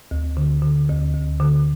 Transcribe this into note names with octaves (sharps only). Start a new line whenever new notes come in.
D2
D3
D3
D2
D2
D3